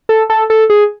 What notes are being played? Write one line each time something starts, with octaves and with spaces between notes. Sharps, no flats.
A4
A4
A4
G#4